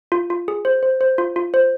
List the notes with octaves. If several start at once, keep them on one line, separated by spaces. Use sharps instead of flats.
F4
F4
G#4
C5
C5
C5
F4
F4
C5